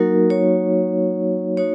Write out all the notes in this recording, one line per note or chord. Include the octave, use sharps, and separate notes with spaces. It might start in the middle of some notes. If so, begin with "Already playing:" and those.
Already playing: F#3 A#3 D#4 F#4 A#4
C#5
A#3 D#4 F#4 C#5